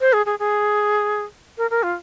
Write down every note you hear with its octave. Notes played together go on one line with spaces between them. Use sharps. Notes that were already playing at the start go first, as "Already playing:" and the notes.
C5
G#4
G#4
G#4
A#4
A#4
F4